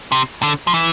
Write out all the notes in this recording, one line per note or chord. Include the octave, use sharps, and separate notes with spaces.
C3
D3
F3
E3